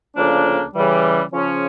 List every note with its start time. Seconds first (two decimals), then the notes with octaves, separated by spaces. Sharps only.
0.16 D2 C#3 F3 A#3 D4
0.75 C#3 E3 G3
1.33 C#3 F3 C#4